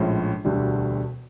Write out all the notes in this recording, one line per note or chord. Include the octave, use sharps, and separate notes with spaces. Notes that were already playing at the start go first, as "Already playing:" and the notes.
Already playing: A#1 A2 F3 G#3 C#4
E1 D2 D3 G3